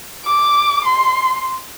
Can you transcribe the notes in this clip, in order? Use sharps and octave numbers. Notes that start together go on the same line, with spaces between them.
D6
C6